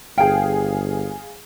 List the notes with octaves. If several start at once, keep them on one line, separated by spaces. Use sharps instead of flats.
G1 G#4 F5 G5